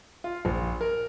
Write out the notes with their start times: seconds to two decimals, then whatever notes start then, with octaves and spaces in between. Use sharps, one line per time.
0.24 F4
0.45 A#1
0.81 A#4